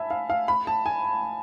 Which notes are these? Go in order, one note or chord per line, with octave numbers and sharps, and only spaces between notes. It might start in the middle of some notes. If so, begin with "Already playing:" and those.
Already playing: E5 G#5 A5 B5
F5
F5
B5
A5
G#5